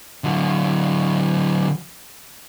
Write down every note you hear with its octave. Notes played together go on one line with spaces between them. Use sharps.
D3 F#3